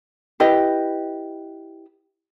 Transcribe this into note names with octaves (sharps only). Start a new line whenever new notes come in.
E4 G4 B4 D#5